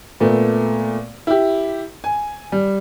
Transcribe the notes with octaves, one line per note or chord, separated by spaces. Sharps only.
A#2 A3 B3
E4 G4
G#5
G3